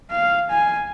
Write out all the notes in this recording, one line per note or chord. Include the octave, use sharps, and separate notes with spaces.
F5
G#5